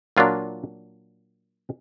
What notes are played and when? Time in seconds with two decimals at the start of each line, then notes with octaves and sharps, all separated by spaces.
0.17 A#2 F#3 A#3 D4 F4